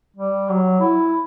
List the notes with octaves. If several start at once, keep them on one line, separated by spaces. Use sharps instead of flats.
G3
F#3
E4